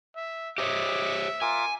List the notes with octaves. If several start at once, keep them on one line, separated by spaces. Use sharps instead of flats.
E5
G4 C5 C#5 D#5 E5 D6
F4 A#4 G#5 D6